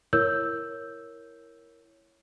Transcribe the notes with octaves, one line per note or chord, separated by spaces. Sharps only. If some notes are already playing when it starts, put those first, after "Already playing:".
E4 A#4 C#5 E6 G6